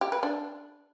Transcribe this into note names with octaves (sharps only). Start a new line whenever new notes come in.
G4
B4
D4